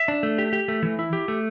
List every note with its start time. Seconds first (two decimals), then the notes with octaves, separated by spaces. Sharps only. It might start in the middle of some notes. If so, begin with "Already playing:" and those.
Already playing: E5
0.08 D4
0.23 A3
0.38 G4
0.53 G4
0.68 A3
0.83 E3
0.99 E4
1.13 G4
1.28 A3